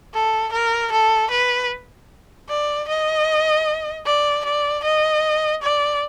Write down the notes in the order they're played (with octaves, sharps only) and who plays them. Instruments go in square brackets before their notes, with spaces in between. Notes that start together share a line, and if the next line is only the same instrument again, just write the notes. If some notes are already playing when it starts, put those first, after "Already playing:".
[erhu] A4
A#4
A4
B4
D5
D#5
D5
D5
D#5
D5